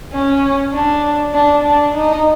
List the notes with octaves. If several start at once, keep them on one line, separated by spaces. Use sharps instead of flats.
C#4
D4
D4
D4
D#4